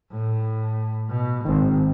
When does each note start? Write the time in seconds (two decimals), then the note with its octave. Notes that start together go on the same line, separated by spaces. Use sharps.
0.12 A2
1.10 B2
1.45 G#1 D#3 C4